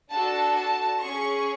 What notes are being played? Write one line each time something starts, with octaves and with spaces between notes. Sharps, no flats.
D4 F#4 A4 A5
A5
C#4 G#4 C#6